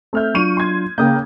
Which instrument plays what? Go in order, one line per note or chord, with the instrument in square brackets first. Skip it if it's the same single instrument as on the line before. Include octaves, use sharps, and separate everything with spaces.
[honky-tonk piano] A3 F6 G6 [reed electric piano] C4 E5
[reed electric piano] F#3 D4 F4 [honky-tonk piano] C#6 D#7
[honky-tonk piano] C6 G#6
[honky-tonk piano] C#3 A#3 [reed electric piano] G5 D#6 G6